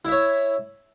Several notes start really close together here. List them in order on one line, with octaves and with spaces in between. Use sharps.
E4 E5 C#5